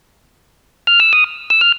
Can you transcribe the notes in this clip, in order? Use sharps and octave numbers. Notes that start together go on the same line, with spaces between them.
F6
E6
D#6
E6
F6